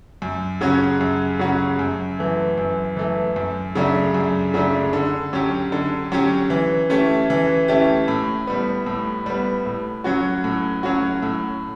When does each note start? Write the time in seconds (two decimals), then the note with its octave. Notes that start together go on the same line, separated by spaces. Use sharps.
0.22 F#2
0.61 C#3 F#3 C#4 F#4
1.01 F#2
1.39 C#3 F#3 C#4 F#4
1.79 F#2
2.19 E3 A3
2.58 F#2
2.97 E3 A3
3.36 F#2
3.75 C#3 F#3 A3 D4
4.14 F#2
4.54 C#3 F#3 A3 D4
4.93 D3
5.33 F#3 C#4 G4
5.72 D3
6.12 F#3 C#4 G4
6.50 E3
6.90 A3 C#4 E4 G4
7.30 E3
7.68 A3 C#4 E4 G4
8.08 A2
8.47 G3 B3
8.86 A2
9.26 G3 B3
9.66 A2
10.04 F#3 C#4 F#4
10.44 A2
10.83 F#3 C#4 F#4
11.23 A2